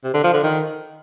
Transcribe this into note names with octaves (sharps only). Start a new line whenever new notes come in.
C3
D3
F3
D3
D#3